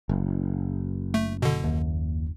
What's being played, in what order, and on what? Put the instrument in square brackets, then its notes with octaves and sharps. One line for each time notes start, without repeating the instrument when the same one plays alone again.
[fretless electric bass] F#1
[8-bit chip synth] A3
B2 D3
[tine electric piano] D#2